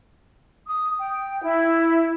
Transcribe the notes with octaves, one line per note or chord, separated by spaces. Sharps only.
D#6
G5
E4